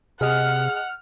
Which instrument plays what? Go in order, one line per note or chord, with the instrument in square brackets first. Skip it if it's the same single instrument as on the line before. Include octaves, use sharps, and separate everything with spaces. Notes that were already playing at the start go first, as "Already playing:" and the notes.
[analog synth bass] C3 [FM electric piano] G#4 D#5 [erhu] F#5 [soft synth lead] F6